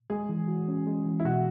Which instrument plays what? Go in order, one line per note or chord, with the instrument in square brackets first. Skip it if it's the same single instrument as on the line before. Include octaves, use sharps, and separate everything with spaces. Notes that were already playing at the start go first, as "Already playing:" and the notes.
[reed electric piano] G#3 [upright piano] G#4
[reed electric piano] E3
F#4
C#4
G#3
E3
[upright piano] E4
[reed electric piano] B2 [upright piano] F#4